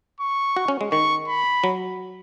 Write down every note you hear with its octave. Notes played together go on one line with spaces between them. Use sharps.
C#6
F#4
C#4
G#3
D#3 C#6
B5
F#3